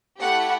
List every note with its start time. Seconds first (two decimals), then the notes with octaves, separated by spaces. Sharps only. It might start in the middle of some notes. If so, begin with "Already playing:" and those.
0.19 A3 E4 G4 F#5